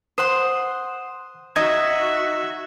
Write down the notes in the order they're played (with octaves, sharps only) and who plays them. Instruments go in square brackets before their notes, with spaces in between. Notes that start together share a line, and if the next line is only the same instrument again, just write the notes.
[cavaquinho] C5 F#5 C6 [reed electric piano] D#6
[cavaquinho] D#4 [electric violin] F#4 E5 [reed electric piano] D#5 G#6